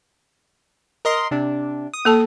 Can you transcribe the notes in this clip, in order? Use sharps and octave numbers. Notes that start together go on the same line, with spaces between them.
A#4 D#5 C6
C3 D4
D#6
A#3 A4 A5